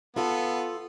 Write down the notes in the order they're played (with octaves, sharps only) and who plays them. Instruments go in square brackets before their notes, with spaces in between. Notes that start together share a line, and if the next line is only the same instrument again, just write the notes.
[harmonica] B3 [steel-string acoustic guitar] F4 A4